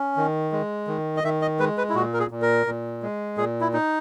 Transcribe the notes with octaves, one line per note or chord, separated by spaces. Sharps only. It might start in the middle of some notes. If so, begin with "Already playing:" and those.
Already playing: C#4
D#3
G#3
D#3
D#5
D#3 E5
D#5
G#3 B4
B4
E4
A#2 F#4
A#4
G#4
A#2
A#4
A#2
G#3
A#2 G#4
E4
D#4